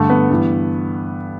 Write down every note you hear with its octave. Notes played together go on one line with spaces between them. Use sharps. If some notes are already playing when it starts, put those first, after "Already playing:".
Already playing: G2 D3 A3
B3
G2 E3